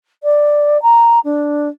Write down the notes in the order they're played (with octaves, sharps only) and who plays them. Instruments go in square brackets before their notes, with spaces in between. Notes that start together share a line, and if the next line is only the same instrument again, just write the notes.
[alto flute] D5
A#5
D4